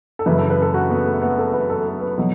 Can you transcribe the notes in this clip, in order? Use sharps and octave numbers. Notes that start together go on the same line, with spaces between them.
A4
F#2 C#3 E3 B4
A4
B4
A4
F#4
B3
A3
B3
A4
B4
A4
A4
B4
B2 F#3